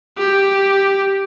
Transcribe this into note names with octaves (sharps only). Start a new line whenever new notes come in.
G4